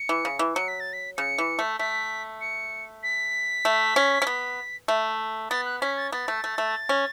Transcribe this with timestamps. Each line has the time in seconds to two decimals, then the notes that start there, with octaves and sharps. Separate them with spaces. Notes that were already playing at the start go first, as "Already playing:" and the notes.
Already playing: C#7
0.09 E3
0.25 C#3
0.39 E3
0.55 F#3 C#7
0.68 B6
0.80 A6
0.93 B6
1.17 C#3 C#7
1.38 E3
1.59 A3
1.79 A3 B6
2.41 C#7
3.03 B6
3.65 A3
3.96 C#4
4.22 C#4
4.27 B3
4.88 A3
5.50 B3 A6
5.65 F#6
5.81 C#4 B6
5.97 A6
6.12 B3 A6
6.28 A3
6.44 A3
6.58 A3
6.89 C#4